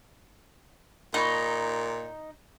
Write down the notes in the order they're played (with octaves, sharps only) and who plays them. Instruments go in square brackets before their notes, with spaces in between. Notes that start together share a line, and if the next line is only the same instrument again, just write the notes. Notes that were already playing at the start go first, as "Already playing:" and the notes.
[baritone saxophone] A#2 [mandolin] D#4 [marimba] A#5 B5 C#6